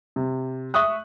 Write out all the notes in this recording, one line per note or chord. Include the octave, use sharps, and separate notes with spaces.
C3
E5 C#6 D#6 F#6